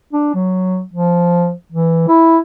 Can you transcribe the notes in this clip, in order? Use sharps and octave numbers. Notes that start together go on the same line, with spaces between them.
D4
F#3
F3
E3
E4